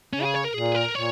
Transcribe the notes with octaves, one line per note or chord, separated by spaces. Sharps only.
C#3 C#4
G#4
C#5
A#4
A#2 G#4
A#4
A#2 C#5